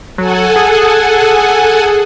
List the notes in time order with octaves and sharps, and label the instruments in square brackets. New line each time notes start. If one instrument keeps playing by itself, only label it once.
[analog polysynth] F#3 [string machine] A4 F#5 G#5
[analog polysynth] G#4